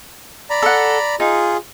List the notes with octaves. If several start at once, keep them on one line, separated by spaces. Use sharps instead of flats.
D5 A#5 B5
A4 F#5
D#4 F4 G#4